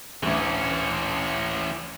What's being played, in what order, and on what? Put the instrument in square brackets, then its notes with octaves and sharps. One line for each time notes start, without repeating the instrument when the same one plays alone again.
[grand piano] A1 D2 [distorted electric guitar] E3 C#4